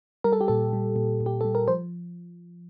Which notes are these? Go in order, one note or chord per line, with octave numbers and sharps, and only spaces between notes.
G3 A#4
A4
G4
A#2 A4
G3
A#2
A#2
G4
G3 A4
A#4
F3 C5